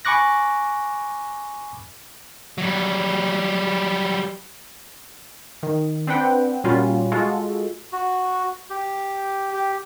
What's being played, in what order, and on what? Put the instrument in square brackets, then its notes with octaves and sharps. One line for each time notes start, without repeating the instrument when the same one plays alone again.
[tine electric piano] G#5 B5 C#6 D6 F#6 A#6
[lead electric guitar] F#3 G3
[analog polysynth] D#3
C4 D4 B4 F#5 G5
A#2 G3 C#4 F4 F#4
G#3 F4 F#4 A4
[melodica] F#4
G4
G4